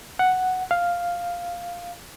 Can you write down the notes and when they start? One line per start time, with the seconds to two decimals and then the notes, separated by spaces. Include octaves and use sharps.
0.19 F#5
0.71 F5